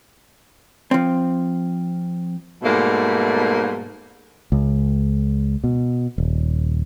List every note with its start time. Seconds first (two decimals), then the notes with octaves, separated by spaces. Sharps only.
0.91 F3 C4
2.62 G#2 B2 G3 A3 A#3
4.52 C#2
5.64 B2
6.18 D#1